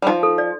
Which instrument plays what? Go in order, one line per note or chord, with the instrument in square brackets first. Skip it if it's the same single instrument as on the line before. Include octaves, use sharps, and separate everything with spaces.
[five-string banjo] G3
[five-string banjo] F3 [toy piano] D#4
[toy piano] A4
D5